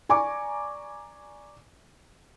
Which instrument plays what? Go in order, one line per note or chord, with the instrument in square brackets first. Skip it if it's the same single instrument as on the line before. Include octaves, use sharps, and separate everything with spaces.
[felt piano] D5 G#5 A#5 C#6 D6